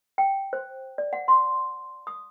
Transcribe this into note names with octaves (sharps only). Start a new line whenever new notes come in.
G5
C5
D5
F#5
C6
D#6